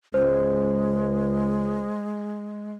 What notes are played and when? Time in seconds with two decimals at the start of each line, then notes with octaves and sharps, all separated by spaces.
0.14 C#2 G#3 C5